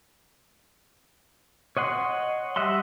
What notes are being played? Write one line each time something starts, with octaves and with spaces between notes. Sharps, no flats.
C#5 D#5 F#5 C6
G3 D#5 E5 F#5 C6